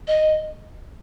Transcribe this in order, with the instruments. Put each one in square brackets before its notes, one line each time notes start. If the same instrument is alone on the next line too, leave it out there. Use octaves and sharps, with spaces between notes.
[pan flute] D#5